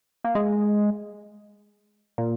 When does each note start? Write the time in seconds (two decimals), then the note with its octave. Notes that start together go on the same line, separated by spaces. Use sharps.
0.24 A#3
0.35 G#3
2.18 A#2